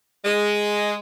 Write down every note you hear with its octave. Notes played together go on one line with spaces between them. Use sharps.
G#3